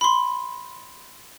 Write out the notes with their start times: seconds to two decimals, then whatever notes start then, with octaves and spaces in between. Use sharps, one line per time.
0.01 B5 C6